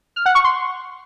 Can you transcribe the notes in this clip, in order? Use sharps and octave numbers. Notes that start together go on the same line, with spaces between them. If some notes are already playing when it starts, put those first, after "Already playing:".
F6
F#5
C#6
C6